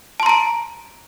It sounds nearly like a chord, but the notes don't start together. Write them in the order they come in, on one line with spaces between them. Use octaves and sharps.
A5 C6 A#5 D7